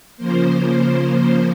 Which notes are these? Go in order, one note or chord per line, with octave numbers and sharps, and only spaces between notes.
C#3 F3 A#3 C5
C5